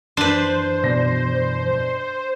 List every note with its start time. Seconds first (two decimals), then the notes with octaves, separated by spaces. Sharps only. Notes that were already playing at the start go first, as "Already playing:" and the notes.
0.17 F#2 E3 D4 B4 C5
0.83 B2 D5 A#6